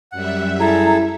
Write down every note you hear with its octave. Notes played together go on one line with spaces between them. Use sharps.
F#2 G3 E5 F#5
E4 G#4 A4 A#5